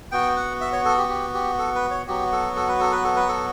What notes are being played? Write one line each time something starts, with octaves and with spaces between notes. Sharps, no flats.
B3 F#4 G5
F#5
E5
C#5
A4
G4
G4
G4
A4
B4
C#5
F#3 B3 F#4 G4
A4
A4
B4
A4
B4
A4
B4
A4